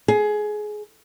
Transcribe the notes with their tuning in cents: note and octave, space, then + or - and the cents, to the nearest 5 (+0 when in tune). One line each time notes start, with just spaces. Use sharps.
G#4 +20